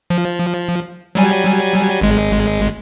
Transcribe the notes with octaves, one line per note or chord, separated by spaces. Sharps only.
F3
F#3 G3 G#5
G#1 G#3